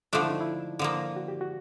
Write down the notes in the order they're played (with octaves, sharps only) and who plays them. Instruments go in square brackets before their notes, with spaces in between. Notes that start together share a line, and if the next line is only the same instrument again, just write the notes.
[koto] D3 F3 A3 D4 [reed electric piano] F4
[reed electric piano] E4
D#4
E4
[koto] D3 F3 A#3
[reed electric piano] F#4
G4
F#4